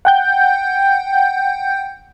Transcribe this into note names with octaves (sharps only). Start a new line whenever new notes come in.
F#5 G5 G6